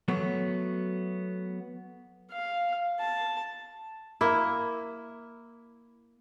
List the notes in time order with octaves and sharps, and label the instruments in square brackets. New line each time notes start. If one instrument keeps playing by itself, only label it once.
[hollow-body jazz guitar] F#3 A3 B3
[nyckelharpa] F5
A5
[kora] A#3 E4